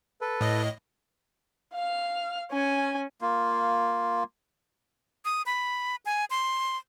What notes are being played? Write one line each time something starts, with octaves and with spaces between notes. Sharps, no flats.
A4 B4
A2 D#5
F5 F6
C#4 G#5
A#3 F4
D#6
B5
G#5
C6